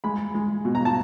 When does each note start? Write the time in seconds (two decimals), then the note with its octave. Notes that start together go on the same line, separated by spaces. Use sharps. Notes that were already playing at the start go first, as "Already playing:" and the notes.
0.04 G#3 B5
0.34 G#3
0.65 B2
0.75 A#5
0.85 A5